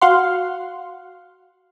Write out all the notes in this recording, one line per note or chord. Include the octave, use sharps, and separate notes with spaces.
F#4 F5 F#5 C6